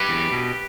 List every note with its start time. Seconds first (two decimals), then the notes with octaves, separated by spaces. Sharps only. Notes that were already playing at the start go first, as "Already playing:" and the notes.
Already playing: G4 B4
0.09 E2
0.32 B2